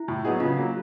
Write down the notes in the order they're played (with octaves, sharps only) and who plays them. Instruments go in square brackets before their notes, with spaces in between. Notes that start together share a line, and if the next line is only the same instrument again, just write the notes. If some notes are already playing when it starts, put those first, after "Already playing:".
Already playing: [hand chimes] E4
[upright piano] A2
F#3 B3 D#4 G#4
[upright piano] C#3 [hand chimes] F4
[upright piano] F#3 A#3